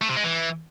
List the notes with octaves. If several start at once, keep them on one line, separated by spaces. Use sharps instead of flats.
A3
C3
G#3
E3